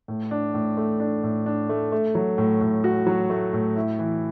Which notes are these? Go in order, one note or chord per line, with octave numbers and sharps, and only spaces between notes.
A2
D4
A2
A3
D4
A2
D4
A3
A3
F#3
A2
A2
F#4
F#3
A3
A2
E4
E3